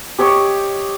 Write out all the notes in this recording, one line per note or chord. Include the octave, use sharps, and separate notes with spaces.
G4 C#5 D#5 C#6